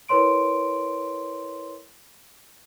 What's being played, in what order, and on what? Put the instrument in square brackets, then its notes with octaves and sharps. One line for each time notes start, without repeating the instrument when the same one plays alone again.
[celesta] E4 A#4 B4 C#5 C6 D7